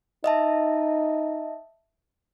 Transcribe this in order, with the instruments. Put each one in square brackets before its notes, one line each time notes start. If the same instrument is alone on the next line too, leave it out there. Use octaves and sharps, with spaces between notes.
[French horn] D#4 [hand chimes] D#5 E5 A5